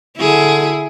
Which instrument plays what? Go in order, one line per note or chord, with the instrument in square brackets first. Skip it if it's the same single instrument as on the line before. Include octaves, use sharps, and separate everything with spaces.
[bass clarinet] D3 [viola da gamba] E4 G#4